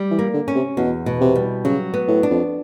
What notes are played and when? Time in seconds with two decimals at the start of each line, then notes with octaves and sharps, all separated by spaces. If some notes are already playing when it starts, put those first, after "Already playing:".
Already playing: G3
0.11 E3
0.19 A#3
0.34 D3
0.48 C#4
0.55 C3
0.77 E2 B2
1.06 B2
1.21 C3
1.35 G3
1.65 C#3 F#3
1.94 B3
2.08 A2
2.23 D4
2.31 F2